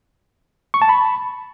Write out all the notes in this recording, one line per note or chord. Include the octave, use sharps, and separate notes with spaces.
C#6
A5
B5